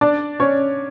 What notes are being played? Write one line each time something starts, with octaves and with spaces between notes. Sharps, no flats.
D4 D5
C#4 C#5